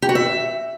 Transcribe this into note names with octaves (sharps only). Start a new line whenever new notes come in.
G4
F#4
E5